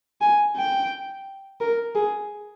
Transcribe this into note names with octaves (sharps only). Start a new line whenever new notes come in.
G#5
G5
A#4
G#4